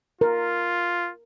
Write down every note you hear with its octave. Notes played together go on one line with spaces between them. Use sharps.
F4 A#4